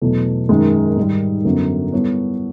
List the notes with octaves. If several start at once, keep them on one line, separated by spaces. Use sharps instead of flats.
E2 B2 F#3 A3
F#2 D#3 G#3
G#2 D#3 G3
F#2 D3 F#3 B3
G3 B3 E4 A4 C#5